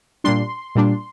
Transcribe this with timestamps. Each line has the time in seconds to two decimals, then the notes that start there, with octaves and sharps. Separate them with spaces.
0.24 A#2 G3 D4 C6
0.75 A#2 G3 D4